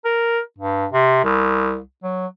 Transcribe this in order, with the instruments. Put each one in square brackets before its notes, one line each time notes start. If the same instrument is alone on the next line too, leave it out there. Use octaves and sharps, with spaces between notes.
[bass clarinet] A#4
G2
C3
C2
F#3